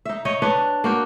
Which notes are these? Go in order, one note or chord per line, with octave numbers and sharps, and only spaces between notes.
D#4 E5
D#4 C#5 D#5
D4 B4 C#5 D#5
A#3 F#4 G5